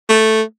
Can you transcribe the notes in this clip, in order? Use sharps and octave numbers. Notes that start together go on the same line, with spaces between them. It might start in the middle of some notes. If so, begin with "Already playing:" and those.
A3